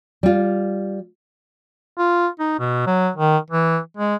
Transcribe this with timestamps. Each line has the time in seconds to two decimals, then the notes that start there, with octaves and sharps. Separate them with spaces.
0.23 G3 F4
1.97 F4
2.40 D#4
2.59 B2
2.87 F#3
3.16 D#3
3.50 E3
3.97 G#3